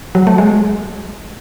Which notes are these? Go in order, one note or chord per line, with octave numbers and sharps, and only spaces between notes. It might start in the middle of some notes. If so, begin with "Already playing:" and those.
F#3
A3
G#3